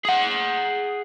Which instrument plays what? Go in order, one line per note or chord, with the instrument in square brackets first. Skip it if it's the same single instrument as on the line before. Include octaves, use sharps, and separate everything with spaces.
[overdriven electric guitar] G#4 F#5